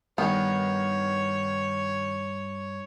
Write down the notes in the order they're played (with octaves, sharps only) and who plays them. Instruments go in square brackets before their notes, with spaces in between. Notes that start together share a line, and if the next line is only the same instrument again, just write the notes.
[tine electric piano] G2 [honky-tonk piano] D#3 [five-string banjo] B3 [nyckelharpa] C#5